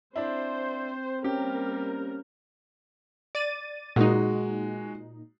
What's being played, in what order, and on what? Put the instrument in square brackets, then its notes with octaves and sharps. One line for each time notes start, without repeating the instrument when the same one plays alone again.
[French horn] C4 [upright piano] D4 E4 [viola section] C5
[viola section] G3 A#3 A#4 [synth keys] C#4 C#5 [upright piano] G4
[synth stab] D5 A6 D#7
[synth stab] A#2 D#4 [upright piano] G#3 F#4